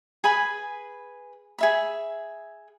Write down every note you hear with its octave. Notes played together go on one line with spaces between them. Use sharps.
G#4 B4 G#5 B5
G#4 E5 B5